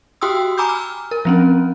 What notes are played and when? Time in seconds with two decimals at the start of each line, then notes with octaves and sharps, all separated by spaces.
0.21 F#4 G4 G5 C6 D#6 E6
0.58 G#5 A#5 B5 D6 E6 G6
0.69 F6
1.11 A#4
1.25 F3 C4 C#4